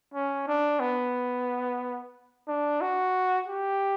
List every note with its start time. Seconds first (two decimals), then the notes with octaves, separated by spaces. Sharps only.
0.14 C#4
0.47 D4
0.80 B3
2.48 D4
2.81 F#4
3.47 G4